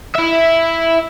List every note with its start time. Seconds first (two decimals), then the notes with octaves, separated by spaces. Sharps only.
0.16 E4 E5